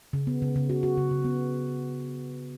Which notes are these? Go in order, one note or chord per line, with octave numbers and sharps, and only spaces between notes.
C#3
B3
C#3
C#3
F#4
F#4
C#3
C#3
B3